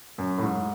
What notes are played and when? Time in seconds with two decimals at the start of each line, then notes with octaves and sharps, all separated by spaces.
0.18 F#2
0.38 A2
0.43 G#2